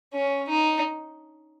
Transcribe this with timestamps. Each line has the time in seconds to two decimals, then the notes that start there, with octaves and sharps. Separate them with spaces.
0.14 C#4
0.49 D#4